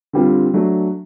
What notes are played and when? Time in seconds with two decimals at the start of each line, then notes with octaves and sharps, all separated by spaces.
0.13 D3 G3 C4 F4
0.54 F#3 A3 D4